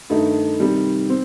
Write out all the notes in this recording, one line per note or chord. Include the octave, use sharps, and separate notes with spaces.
G2 D#3 A3 D#4
C3 D#3 G3
C4